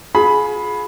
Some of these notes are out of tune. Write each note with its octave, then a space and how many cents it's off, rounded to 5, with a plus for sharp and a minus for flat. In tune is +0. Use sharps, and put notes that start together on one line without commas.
F4 +40 G#4 +20 B5 -5